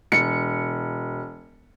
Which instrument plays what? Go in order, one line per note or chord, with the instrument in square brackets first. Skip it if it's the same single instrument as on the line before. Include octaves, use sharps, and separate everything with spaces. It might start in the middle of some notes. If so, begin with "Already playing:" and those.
[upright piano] E1 C#7